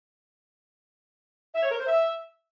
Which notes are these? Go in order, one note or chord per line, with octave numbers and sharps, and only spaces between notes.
E5
C#5
A#4
C5
E5